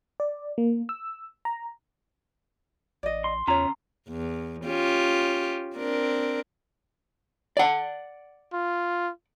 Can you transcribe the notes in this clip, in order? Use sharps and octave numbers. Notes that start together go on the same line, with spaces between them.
D5
A#3
E6
A#5
A1 D5 D#5
C6
E2 C#3 F4 C#5 A#5
E2
C#4 F4 G4
C4 D4 A#4
D5 F#5
F4